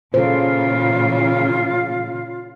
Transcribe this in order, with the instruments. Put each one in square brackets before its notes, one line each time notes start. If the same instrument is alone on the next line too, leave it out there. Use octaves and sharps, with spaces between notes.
[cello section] A#2 C#3 E3 [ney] F4 [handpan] A4 C5